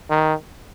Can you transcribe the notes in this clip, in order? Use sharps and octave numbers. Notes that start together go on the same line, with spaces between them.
D#3